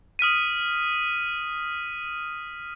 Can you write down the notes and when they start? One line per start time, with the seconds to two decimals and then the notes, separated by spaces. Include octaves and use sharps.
0.19 D#6 F6 B6 D#7